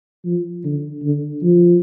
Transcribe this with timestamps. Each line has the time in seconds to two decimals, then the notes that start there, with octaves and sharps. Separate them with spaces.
0.25 F3
0.64 D3
1.04 D3
1.43 F3